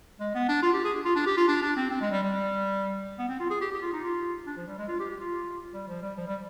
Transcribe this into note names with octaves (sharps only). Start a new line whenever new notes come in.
G#3
B3
D4
F4
G4
G#4
F4
D4
G4
F4
D4
D4
C4
C4
G#3
G3
G3
B3
C4
F4
G#4
G4
G4
F4
D#4
F4
D4
F3
G3
G#3
F4
G4
G4
F4
G3
F3
G3
F3
G3